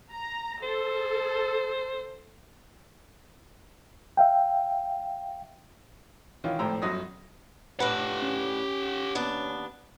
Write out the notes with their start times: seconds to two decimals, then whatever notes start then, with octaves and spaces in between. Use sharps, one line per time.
0.12 A#5
0.63 A4 C5
4.17 E5 F5 G5
6.44 D#3 E3 C#4 F4
6.59 G#1 A2 F3 G5 A#5 E6
6.82 G1 F#2 F#3 D#6 A#6
7.80 A2 D4 G4 B4 F#5
8.22 C#4
9.15 D#2 B3 D4